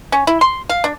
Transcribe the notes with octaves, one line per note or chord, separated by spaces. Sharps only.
C#4
E4
C6
F5
D4